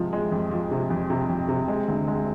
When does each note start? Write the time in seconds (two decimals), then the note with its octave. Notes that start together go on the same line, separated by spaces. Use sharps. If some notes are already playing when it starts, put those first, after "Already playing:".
Already playing: C3 F3 G#3
0.13 G#3
0.32 F2
0.51 F3
0.71 C3
0.90 F2
1.10 C3
1.29 F2
1.49 C3
1.68 G#3
1.88 D2
2.08 G#3